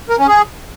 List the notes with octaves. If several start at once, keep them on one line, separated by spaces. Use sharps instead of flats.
A#4
C#4
G#4